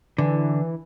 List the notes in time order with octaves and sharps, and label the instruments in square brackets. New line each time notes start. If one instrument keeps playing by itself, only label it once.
[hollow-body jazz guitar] D3 [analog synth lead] E3